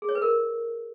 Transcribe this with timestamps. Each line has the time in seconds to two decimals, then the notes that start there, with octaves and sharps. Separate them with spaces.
0.02 G#4
0.09 C#5
0.15 B4
0.22 A#4